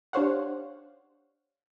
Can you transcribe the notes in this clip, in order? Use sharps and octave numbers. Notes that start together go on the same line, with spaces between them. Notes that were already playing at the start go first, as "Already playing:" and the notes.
D4 G4 C5 C#5 F5 F#5